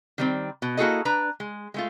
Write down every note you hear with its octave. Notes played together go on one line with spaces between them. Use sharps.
D#3 G3 C4
B2
A#3 E4 F#4 G#4 A4 D#5
D4 B4 A#5
G#3
G#3 A3 F4